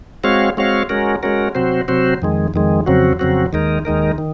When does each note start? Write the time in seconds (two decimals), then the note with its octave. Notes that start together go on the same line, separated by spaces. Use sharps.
0.24 G#3 C4 F#4 C#5 F5
0.57 G#3 C4 F#4 C#5 F5
0.89 G#3 C#4 F#4 A#4
1.23 G#3 C#4 F#4 A#4
1.55 C3 F#3 C4 F#4 C5
1.88 C3 F#3 C4 F#4 C5
2.22 F2 D#3 G#3
2.54 F2 D#3 G#3
2.86 F2 C#3 F#3 C4 F#4
3.19 F2 C#3 F#3 C4 F#4
3.53 D#2 D#3 G#3 D#4 A#4
3.85 D#2 D#3 G#3 D#4 A#4
4.18 D#3